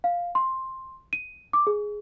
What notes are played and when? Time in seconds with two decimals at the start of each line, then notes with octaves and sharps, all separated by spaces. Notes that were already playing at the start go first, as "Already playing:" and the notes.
0.04 F5
0.35 C6
1.13 D#7
1.53 D6
1.67 G#4